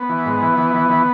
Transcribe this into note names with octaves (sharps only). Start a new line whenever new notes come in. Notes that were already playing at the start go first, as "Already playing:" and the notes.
Already playing: B3
E3
G#2
E3
E3
E3
E3